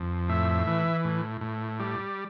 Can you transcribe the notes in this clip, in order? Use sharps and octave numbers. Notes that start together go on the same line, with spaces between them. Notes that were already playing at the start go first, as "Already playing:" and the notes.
Already playing: F2
A2 E5
E3
A2
A2
G3